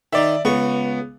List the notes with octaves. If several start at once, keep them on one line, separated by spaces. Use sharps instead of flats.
D#3 D#4 D5 E5
C#2 C#3 B3 C#6